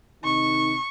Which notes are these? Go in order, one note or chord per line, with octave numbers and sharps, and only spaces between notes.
C3 D#3 D#4 C#6